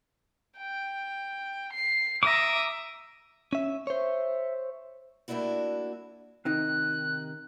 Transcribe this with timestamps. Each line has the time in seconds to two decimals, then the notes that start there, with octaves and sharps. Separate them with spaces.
0.58 G5
1.73 C7
2.23 E5 A#5 D6 D#6
3.53 C#4 E5
3.87 C5 C#5 E5
5.28 G3 A3 A#3 D4 E4 F#4
6.45 C3 D#3 D#4 F#6